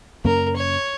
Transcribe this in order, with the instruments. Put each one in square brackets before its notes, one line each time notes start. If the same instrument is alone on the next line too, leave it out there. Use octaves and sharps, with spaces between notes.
[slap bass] F#2 C#3 A#3 C#4 [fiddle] A#4
[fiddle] C#5